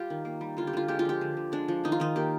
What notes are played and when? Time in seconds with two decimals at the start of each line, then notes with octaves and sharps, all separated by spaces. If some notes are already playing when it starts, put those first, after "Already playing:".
Already playing: G3 F4 G4
0.10 D#3
0.25 A#3
0.41 G3
0.57 D3 F4
0.67 G4
0.73 D3 F4
0.88 G#3 G4
0.99 F4
1.05 F3 G4
1.21 D3
1.37 D3
1.52 G#3 D4
1.68 F3
1.84 D#3 D#4
1.92 F4
2.00 D#3 D#4
2.16 A#3 G4